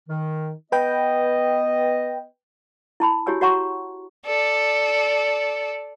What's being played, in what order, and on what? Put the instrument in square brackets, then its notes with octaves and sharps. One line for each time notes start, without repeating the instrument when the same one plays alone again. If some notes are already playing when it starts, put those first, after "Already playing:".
[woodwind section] D#3
[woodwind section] B3 D#5 [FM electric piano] B4 G5
[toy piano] E4 A5 B5
E4 F#4 G4 C#5 G#5 E6
F#4 C#5 F#5 A#5 C6 C#6
[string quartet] A4 D5